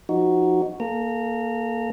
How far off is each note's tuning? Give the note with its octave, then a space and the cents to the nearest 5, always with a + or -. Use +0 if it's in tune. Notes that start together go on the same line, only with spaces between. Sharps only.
F3 +0 D#4 +0 F#4 +0
A#3 +0 A4 -35 A#5 -20